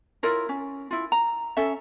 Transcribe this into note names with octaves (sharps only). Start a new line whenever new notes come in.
E4 F4 A#4 C#5
C#4
E4 F4
A#5
C#4 A4 E5